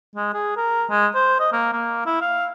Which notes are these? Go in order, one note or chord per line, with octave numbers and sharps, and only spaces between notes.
G#3
G#4
A#4
G#3
C5
D#5
A#3
A#3
E4
F5